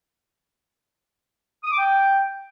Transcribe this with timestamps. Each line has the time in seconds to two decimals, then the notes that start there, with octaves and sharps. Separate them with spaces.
1.64 D#6
1.71 D6
1.78 G5